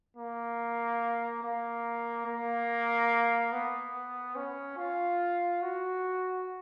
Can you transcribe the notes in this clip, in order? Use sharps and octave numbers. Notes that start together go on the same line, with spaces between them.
A#3
A#3
A#3
B3
C#4
F4
F#4